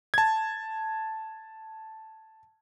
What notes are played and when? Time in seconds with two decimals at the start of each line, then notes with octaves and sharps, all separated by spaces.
0.14 A5 G#6